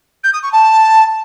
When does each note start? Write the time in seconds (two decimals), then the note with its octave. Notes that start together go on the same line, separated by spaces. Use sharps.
0.23 G6
0.33 D#6
0.42 C#6
0.52 A5